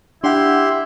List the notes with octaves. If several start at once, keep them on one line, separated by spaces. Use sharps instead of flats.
D4 E4 G4 F#5 C6